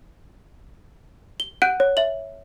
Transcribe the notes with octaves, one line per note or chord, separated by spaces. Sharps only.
G7
F#5 F#6 G6 D7 D#7
C#5
E5 F#7